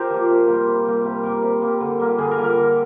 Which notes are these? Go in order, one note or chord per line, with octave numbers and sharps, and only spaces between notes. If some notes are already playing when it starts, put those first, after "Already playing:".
Already playing: F4 G4 A#4 C5
F3 A#3
C3
G3 A#3
C3
G3 A#3
C3 G4
G3 A#3 A#4
C3
G3 A#3
D3
G3 A#3
D3 G#4
A#4
G3 A#3
A#4
D3